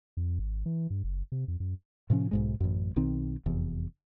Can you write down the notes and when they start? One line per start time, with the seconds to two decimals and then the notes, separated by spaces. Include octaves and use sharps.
0.17 F2
0.39 G#1
0.66 E3
0.90 G2
1.04 F#1
1.32 C3
1.48 F2
1.60 F#2
2.10 A2 C3 F3 C#4
2.31 B1 G#2 G#3
2.60 A1 F#2
2.96 B1 D#3 C4
3.46 F1 E2